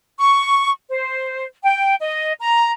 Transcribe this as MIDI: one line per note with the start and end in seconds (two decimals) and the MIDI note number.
0.19 0.70 85
0.88 1.44 72
1.63 1.94 79
2.00 2.32 75
2.40 2.71 82